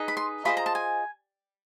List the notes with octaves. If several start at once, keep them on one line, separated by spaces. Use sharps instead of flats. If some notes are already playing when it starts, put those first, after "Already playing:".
Already playing: D#4 G#4 B4 D#5
B5
C6
F4 G#4 C5 D#5 B5
A#5
A5
G#5